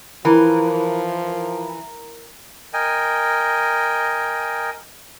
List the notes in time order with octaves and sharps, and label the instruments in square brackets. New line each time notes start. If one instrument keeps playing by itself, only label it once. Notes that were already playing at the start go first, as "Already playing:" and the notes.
[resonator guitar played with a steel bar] E3 [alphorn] F3 [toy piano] E4 B5 [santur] A#4
[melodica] A#4 D#5 G5 G#5